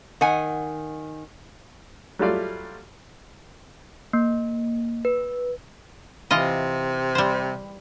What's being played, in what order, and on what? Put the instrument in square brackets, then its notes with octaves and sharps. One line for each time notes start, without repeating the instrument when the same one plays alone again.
[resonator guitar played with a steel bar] D#3 F#5 G#5
[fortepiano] F#3 G3 A3 F4 D5
[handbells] A#3
B4
[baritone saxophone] C3 [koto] E3 F4 D#5
[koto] G3 C5